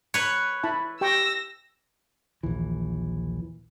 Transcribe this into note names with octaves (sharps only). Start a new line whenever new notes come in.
B4 C#5
E4 A5 B5
G4 G5 C#6 E6 A#6
A#1 D#2 E3